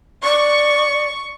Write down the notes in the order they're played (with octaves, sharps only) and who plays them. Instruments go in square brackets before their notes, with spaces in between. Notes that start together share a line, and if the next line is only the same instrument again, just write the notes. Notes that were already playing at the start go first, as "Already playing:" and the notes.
[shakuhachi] D5 [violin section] C#6